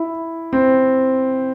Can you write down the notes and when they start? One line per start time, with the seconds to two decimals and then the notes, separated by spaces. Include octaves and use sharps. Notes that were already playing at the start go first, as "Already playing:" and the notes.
Already playing: E4
0.53 C4